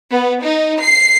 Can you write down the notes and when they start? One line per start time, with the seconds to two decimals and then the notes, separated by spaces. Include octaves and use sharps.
0.11 B3
0.43 D#4
0.81 C7